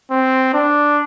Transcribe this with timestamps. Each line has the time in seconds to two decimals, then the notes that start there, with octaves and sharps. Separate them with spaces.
0.11 C4
0.54 D4